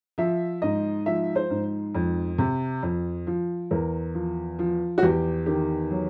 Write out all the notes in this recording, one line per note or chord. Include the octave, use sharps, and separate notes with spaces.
F3 E5
G#2 D#5
F3 E5
C5
G#2
F2
C3
F2
F3
E2 A#4
F3
F3
F#4
E2 G4
D#3 G4
F#3